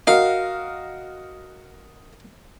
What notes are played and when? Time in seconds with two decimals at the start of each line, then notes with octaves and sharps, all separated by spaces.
0.07 F#4 A#4 D#5 F5